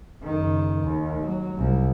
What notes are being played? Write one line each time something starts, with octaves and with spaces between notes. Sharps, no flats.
F#1 D#3
D#2
F#3
C2